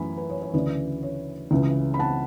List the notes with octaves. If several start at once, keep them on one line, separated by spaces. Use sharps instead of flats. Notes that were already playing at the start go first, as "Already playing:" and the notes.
Already playing: F#2 E3 A3 G#5 B5
B4
C#5
C#5
D2 C#3 E3 B4 D5
C#5
C#2 C#3 E3
B5
F#5 A5